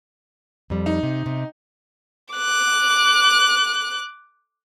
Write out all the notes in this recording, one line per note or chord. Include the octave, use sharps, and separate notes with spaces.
F2 G3
D#4
C3
C3
D6 F#6